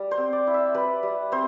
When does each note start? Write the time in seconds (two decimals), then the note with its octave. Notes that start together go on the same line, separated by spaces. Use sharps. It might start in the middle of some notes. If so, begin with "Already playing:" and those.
Already playing: G3
0.11 C5
0.18 C4
0.33 D5
0.47 E4
0.54 E5
0.74 G3 B4
1.03 G3
1.32 C4 C5